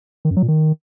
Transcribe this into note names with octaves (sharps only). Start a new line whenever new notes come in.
D#3
F#2
F#3
A#2
D#3